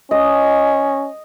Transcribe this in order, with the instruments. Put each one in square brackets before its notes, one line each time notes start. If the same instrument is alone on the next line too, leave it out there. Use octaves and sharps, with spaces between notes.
[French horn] C#4 [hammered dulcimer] D#5